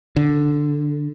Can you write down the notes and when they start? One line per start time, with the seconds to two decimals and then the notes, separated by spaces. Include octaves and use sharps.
0.16 D3